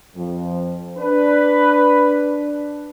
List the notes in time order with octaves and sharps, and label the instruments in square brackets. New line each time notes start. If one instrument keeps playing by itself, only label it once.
[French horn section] F2 F3
[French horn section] D4 [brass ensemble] B4